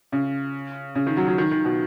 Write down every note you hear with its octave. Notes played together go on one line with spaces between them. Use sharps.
C#3
C#3
D#3
F#3
F#3
D#3
D#3
B2